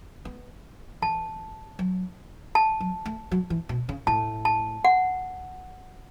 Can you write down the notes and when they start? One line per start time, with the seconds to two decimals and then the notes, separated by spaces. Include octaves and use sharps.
0.25 B3
1.02 E3 A5
1.79 F#3
2.55 A5
2.80 F#3
3.05 A3
3.31 F#3
3.50 E3
3.69 B2
3.89 C#3
4.07 A2 A5
4.45 A5
4.85 F#5